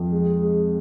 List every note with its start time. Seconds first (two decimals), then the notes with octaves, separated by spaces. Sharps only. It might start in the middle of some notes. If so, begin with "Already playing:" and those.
Already playing: F2 F4
0.11 G#3
0.41 G#3